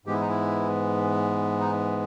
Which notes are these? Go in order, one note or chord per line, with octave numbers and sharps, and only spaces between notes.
G#2 E3 G#3 B3 G4
E4
D#4
E4
D#4